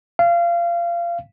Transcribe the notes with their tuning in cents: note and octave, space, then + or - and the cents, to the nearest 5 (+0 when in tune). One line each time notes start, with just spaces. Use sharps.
F5 -25